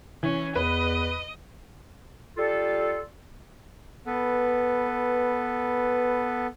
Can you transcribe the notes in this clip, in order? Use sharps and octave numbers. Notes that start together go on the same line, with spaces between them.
E3 C#4
E2 B4 D#5
G3 F4 A4
B3 A4 B4